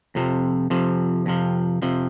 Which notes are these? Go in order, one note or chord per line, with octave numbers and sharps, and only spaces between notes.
F2 C3 F3
F2 C3 F3
F2 C3 F3
F2 C3 F3